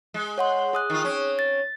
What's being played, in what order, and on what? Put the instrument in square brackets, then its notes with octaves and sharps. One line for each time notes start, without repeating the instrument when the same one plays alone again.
[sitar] G#3
[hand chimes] C#5 F#5 C6
G#4 D#6 F#6
[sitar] D#3 F4
C4 C#4
[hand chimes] A6